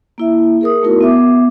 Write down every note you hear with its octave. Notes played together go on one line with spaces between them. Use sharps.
A#3 E4 E5
G#4 A#4 D#6
A3 B3 D#4 E4 F#4 A#4
B3 E5 D6